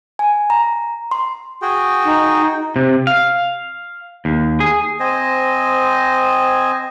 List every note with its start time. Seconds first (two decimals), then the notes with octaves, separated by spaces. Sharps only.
0.19 G#5
0.50 A#5
1.11 C6
1.62 F#4 G#4 G5
2.04 D#4
2.76 C3
3.07 F5
4.25 D#2
4.60 G#4
5.00 C4 C5 D#5 G#5